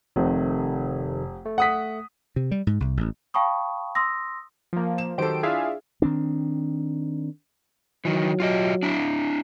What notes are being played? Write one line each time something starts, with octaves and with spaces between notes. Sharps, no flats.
F1 F2 C3 D#3
A3
F#5 D#6 B6
C3
G3
G#2
C2
A1
F5 G5 A5 B5 C#6 D#6
C6 D#6 E6 A#6
F3 A#3
E7
D#3 F#3 G4 A4 C5 D7
D4 E4 F4 G#4 E5 F5
D#3 C4 D4
D#3 E3 F#3
F4 G4 D#5
D4 E4